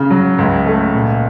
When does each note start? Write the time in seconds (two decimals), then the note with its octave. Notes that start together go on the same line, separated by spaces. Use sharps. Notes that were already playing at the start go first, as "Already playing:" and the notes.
Already playing: C#3
0.10 F#3
0.38 C#2
0.66 A3
0.94 A#2